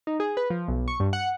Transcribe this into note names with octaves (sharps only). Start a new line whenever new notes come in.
D#4
G#4
B4
F3
B1
C#6
G2
F#5